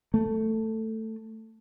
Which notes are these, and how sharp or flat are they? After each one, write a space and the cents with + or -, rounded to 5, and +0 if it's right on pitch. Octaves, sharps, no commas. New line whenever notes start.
A3 +10